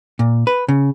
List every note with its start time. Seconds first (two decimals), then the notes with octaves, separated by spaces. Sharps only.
0.19 A#2
0.47 B4
0.68 C#3